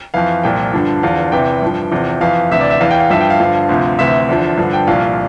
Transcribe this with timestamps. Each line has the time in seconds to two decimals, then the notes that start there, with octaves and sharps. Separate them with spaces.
0.14 F2 E3 F5
0.43 C2 A#2 F3 G5
0.73 G2 D3 F3
1.03 E2 D3 F3 F5
1.32 E2 C3 E3 G5
1.62 G2 F3
1.91 E2 C3 F3
2.21 F2 E3 F5
2.51 D2 C3 E3 E5
2.61 D5
2.70 E5
2.80 E2 E3 F5
2.91 G5
3.00 F5
3.10 G2 F3 E5
3.21 G5
3.30 F5
3.39 G2 D3 F3
3.69 D2 C3 F3
3.99 D2 C3 E3 E5
4.29 E2 D3 F3
4.58 G2 D3 F3
4.73 G5
4.87 C2 A#2 F3 F5